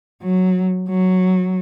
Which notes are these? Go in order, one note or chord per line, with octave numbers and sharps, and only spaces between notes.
F#3
F#3